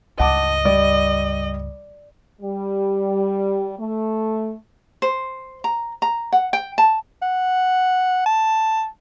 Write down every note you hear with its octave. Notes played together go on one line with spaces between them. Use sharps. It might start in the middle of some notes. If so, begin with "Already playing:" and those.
C#2 G2 D#5 F#5 A5 D6
G3 D5
G3
A3
C5
A#5
A#5
F#5
G5
A5
F#5
A5